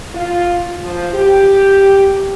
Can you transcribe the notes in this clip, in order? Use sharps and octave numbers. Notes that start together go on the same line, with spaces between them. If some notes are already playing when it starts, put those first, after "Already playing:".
F4
F3
G4